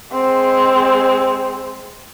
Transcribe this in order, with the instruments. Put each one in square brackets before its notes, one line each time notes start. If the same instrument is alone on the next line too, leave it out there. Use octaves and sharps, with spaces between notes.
[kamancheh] G#3 C4